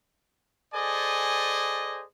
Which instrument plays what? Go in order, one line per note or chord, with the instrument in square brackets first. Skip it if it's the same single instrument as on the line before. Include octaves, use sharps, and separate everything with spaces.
[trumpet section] G#4 A4 C5 D5 D#5 G#5